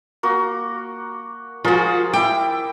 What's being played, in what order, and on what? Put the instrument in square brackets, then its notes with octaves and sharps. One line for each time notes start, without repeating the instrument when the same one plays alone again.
[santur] A#3 F#4
[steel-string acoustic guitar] F3 F#4 [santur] F4 G#4 A#4
[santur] E4 D6 [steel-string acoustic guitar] G5